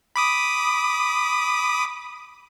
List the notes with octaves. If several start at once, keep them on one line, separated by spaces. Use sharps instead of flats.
B5 D6 D#6